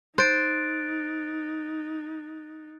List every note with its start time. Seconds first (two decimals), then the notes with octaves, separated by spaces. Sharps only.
0.18 D#4 C5 F#6 A6 D7